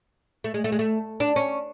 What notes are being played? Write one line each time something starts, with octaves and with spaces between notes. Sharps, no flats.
A3
G#3
A3
G#3
A3
D4
C#4